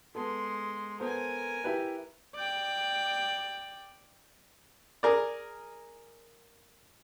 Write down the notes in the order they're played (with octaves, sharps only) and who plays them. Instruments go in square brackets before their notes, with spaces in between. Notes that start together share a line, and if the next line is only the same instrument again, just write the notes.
[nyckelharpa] G#3 C6 [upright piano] B3 A4
[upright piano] B3 A4 C5 [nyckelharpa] A#4 G#5
[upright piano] E4 G4 B4
[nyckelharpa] D5 G5
[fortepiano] G#4 A#4 D5